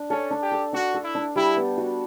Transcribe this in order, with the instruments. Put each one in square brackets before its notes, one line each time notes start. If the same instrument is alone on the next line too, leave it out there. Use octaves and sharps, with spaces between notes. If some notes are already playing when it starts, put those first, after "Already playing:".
Already playing: [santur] D4
[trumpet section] C#4 [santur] A4
[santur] D4
[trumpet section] G4
[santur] A4
[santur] D4 [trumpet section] F#4
[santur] A4
[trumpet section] E4
[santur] D4
[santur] G3 [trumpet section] E4
[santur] B3
F#4